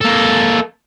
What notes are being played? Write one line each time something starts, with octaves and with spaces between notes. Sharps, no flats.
A#3 A4